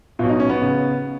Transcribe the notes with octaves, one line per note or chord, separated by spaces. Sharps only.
B1 B2 F4
D#4
C#4
B3
C#3